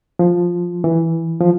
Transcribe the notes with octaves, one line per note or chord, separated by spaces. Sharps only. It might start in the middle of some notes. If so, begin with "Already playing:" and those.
F3
E3
F3